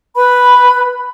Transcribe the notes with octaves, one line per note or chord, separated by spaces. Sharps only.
B4 B5